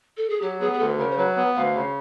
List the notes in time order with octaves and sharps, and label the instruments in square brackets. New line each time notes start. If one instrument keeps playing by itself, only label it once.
[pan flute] A4
G#4
[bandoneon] F#3 [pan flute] G4
[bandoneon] B3 [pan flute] G#4
[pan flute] G#4
[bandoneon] D2 [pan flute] A4
[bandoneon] C#3 [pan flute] A#4
[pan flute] C5
[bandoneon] F#3 [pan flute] B4
[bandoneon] B3
[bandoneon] D2 [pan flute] F5
[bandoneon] C#3